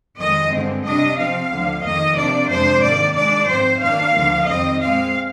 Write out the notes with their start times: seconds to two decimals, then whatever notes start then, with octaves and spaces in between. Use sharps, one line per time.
0.17 F2 D#3 G#3 D#5
0.50 G2 D3 G#3 C4
0.83 C3 G3 D4 D#5
1.17 C3 F3 C4 F5
1.50 D2 D3 F3
1.82 F2 D#3 A#3 D#5
2.15 C3 F3 A#3 D4 D5
2.48 F2 C3 F3 G#3 D4 C5
2.81 G#2 D#3 A#3 D5
3.14 A#2 G#3 D4 D5
3.47 G#2 F3 C4 C5
3.80 D#2 D#3 A#3 D4 F5
4.13 D2 D3 F3 A#3
4.46 F2 D#3 G3 C4 D#5
4.79 A#2 G#3 C4 F5